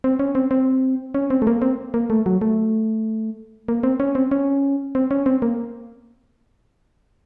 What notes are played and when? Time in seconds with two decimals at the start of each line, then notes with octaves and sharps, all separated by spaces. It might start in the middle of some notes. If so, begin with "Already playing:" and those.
0.04 C4
0.19 C#4
0.35 C4
0.51 C4
1.15 C#4
1.30 C4
1.42 A3
1.47 A#3
1.62 C4
1.94 A#3
2.10 A3
2.26 F#3
2.41 A3
3.68 A#3
3.83 C4
4.00 C#4
4.15 C4
4.31 C#4
4.95 C4
5.11 C#4
5.26 C4
5.42 A#3